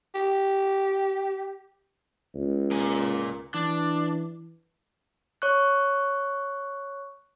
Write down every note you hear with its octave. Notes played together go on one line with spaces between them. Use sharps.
G4
C#2
A#3 G#5
E3 D4
C#5 C#6 F#6